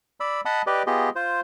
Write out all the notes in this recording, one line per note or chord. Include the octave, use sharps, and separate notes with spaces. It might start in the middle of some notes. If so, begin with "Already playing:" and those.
D5 B5 E6
D#5 F#5 A5 B5 D#6
G4 B4 D5 D#5
B3 F4 G4 G#4 D#5
F4 C5